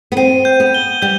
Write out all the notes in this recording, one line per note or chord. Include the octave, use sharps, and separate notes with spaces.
B3
C4 D#7
G6
B3
G7
G3 G6